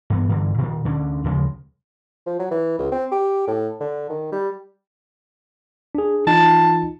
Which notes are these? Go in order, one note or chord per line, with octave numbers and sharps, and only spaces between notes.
G2 E3 B3
G2 D3 E3
A#2 D#3
D2 D3 C#4 D4
D#2 C#3 F3 G#3
F3
F#3
E3
C#2
C4
G4
A2
D3
D#3
G3
D4 G#4
E3 D#4 F4 A5